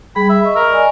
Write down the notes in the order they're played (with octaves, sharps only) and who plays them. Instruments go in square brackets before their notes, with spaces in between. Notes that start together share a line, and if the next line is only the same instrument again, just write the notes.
[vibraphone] G3 G#4 [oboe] B5
[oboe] E5 [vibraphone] B5
[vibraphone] D#5 C#6
[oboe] A#4
[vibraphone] D5 D#5 G#5